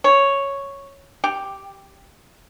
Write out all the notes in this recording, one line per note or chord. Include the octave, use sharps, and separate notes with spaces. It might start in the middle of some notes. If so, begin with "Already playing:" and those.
C#5
G4